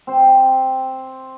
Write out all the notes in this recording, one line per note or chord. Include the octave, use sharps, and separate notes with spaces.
C4 C5